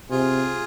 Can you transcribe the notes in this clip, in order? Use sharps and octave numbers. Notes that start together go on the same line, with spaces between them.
C3 F4 G#4